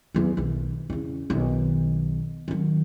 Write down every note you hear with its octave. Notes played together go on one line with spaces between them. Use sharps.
E2 F#3
B1 D#3
E2 C#3
B1 D#3
D#3 F#3